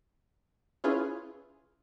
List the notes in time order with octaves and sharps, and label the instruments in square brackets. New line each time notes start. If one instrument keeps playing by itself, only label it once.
[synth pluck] C#4 E4 F4 G#4 B4